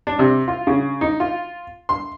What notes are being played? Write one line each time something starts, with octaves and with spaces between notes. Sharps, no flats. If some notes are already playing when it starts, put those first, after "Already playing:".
D4
C3
F4
C#3
D#4
F4
C6